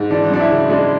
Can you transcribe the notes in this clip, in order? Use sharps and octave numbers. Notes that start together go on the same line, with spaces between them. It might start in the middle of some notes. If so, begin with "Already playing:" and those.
Already playing: G#2
E3 D4
F#2 D4
E4
C#3
G#3 D4